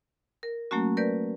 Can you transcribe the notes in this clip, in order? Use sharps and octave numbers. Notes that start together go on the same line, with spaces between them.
A#4
F#3 A3 A#3 C#4 F#4
A#4 B4 D5 G6